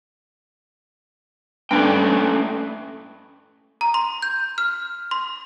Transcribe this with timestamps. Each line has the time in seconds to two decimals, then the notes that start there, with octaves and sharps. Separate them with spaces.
1.71 G2 A3 C#4 G5
3.81 A#5
3.94 C6
4.22 G6
4.58 F6
5.11 C6